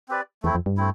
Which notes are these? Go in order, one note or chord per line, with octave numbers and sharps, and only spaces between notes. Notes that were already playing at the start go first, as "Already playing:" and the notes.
C4 G4 B4 D5
E2 A3 C4 E4
F2
G2
A3 C4 E4